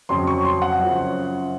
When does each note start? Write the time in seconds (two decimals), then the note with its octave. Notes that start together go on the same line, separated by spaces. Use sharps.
0.09 F2 C#3 F#3 C6
0.27 C#6
0.45 C6
0.62 F#5
0.79 F#2 C#3 F3